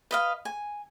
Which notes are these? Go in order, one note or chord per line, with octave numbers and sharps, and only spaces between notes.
B4 D#5 F5
G#5